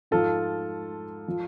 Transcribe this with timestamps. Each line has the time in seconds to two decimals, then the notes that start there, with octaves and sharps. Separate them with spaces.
0.11 G#2 F3 F4 A4
1.28 F3